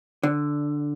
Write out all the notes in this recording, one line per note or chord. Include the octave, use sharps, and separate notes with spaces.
D3